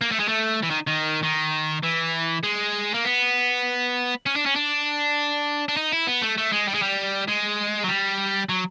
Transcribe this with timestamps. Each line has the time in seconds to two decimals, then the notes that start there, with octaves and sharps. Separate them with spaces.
0.01 A#3
0.12 A3
0.20 G#3
0.28 A3
0.63 E3
0.70 D#3
0.87 D#3
1.23 D#3
1.83 E3
2.43 G#3
2.94 A#3
3.04 B3
4.26 C#4
4.36 D4
4.46 C#4
4.56 D4
5.68 D4
5.77 D#4
5.92 E4
6.07 B3
6.22 A3
6.38 A3
6.53 G#3
6.68 G3
6.75 G#3
6.83 G3
7.28 G#3
7.84 F#3
7.88 G3
8.49 F#3